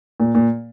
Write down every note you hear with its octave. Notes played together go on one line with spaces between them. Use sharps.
A#2
A#2